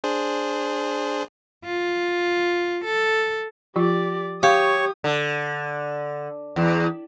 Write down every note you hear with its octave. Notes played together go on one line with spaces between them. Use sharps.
D4 G#4 C5
F4
A4
F3 F4 G4 D5
G4 C#5 F5 C#6 D#6
D3
E2